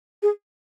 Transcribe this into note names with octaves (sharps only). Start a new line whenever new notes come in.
G#4